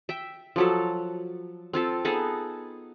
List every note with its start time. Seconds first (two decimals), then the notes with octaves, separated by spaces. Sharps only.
0.09 E5 G5
0.56 F3 F#3 A4
1.73 C4 F4 A4
2.05 B3 D#4 G#4 A4